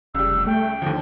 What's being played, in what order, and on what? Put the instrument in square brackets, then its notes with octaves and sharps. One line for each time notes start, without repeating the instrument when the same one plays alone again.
[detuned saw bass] F1 [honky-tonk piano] C#2 G3 [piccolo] E6
[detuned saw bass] A3 [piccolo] G5
[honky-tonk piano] D#2 F3 [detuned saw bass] D3